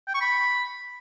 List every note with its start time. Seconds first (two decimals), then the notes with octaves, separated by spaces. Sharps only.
0.07 G5
0.14 C#6
0.21 B5